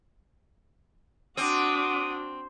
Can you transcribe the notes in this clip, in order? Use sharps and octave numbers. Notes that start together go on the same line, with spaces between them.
C4 D4 F#4 F#5 D6 D#6